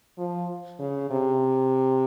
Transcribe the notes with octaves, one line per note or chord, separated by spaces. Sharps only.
F3
C#3
C3